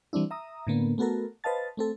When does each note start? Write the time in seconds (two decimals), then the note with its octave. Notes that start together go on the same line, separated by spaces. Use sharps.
0.13 E3 G3 C4 D4 E4
0.31 E5 A#5 D#6
0.67 A2 D3 A#3 B3
0.98 A3 B3 F#4 A4 A#4
1.44 B4 C5 D#5 F5 A5 A6
1.77 A3 C4 A4